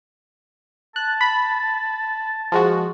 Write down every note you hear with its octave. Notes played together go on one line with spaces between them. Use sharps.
A5 F#6
B5
F3 G#3 F#4